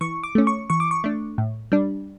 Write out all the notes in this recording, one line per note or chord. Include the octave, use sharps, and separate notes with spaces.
E3 C#6
D6
A3 C#4
C#6
E3 C#6
D6
C#6
A3 D4
A2
G3 D4